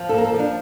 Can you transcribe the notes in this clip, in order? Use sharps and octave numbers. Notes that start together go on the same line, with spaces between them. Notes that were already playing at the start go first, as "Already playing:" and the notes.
Already playing: F3
A4
A#3 A#4
A4
F3
D4